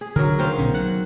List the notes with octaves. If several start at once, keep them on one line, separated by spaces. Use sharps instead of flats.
G#4
D3 F#3 A#4
D#3 C5 F5
B1 B2 C#4
F#3 F#5